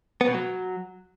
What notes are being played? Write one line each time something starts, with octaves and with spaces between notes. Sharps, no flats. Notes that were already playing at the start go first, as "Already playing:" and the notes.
B3
B2
F#3